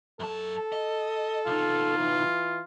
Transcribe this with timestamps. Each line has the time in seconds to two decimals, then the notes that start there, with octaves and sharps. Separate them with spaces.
0.20 F#2 A4 A5
0.72 D#5
1.47 C2 D#4 F4
1.98 E3